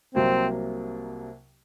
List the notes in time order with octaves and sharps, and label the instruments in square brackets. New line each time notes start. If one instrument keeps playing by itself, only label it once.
[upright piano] C2 C3 F#3 A#3 [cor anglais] C4